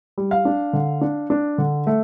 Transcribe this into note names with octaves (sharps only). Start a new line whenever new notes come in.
G3
F5
D4
D3
D4
D4
D3
A3